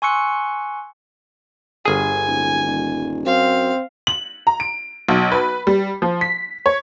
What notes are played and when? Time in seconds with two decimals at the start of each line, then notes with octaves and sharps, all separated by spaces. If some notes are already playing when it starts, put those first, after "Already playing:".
0.02 G#5 C6 C#6 E6 F#6 C#7
1.86 G1 D3 G#4 G#5
2.27 D1
2.66 D#1
3.26 F#2 C4 F5
4.07 F#7
4.47 A#5
4.60 D7
5.09 B1
5.32 B4
5.67 G3
6.02 F3
6.21 B6
6.66 C#5